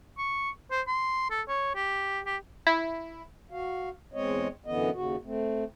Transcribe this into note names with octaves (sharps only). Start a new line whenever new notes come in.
C#6
C5
C6
A4
C#5
G4
G4
E4
F#4 F5
E2 G#3 C4 C#5 D#5
F#2 D3 E3 B3 D#5
D#2 C#3 F#4
A3 C4